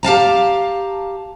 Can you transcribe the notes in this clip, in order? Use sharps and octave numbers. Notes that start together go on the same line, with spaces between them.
G4 F5 A5 A#5